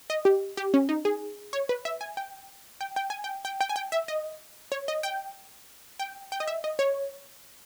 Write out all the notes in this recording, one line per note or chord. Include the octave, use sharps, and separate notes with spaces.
D#5
G4
G4
C#4
D#4
G#4
C#5
B4
E5
G#5
G5
G5
G5
G#5
G5
G5
G5
G#5
G5
E5
D#5
C#5
D#5
G5
G5
G5
D#5
E5
D#5
C#5